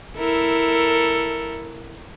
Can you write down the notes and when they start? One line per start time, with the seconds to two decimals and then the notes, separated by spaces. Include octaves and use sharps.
0.17 E4 A4 A#4